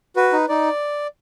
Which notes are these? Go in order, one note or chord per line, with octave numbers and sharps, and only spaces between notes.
F#4 B4
D#4
D#4 D5